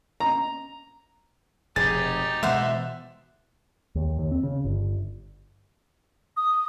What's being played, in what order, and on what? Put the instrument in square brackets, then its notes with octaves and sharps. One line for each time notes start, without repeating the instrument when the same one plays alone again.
[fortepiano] A#5
[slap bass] F1 B2 [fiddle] D#4 G4 [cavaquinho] G#4 [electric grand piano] A6
[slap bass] B2 E3 G#3 [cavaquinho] C5 F#5 C6 [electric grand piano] E5
[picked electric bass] D#2
D#2
C4
C#3
G1
[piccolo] D#6